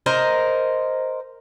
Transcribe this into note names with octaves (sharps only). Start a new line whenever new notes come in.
A#4 C5 D#5